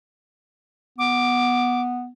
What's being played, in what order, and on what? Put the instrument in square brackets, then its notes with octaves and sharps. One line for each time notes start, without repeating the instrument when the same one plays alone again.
[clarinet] B3 [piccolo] D6